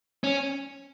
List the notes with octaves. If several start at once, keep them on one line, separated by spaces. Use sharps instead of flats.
C#4